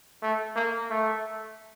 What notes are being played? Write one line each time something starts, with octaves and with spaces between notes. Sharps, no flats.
A3
A#3
A3